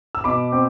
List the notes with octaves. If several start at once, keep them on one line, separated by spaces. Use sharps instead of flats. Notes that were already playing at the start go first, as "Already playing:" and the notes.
E6
B2 B5 D6
C4